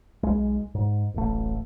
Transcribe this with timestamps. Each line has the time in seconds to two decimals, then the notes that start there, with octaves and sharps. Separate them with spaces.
0.23 B1 G#3
0.75 G#2
1.14 D1 A1 A3